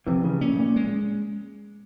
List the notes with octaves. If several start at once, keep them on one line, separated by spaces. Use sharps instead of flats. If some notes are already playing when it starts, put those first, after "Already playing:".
C3 E3 F3
C#3
A#2 C#4
G#2
A#2
G#3